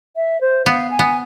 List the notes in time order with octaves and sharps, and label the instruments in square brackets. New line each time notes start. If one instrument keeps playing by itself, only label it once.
[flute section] E5
C5
[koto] B3 [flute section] F5
[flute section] G#5
[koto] B3